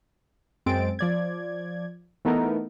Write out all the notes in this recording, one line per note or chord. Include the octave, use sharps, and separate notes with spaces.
F#2 G#3 C4 A6 D7
F3 D5 G#6
E3 A3 B3 D#4 A4 A#4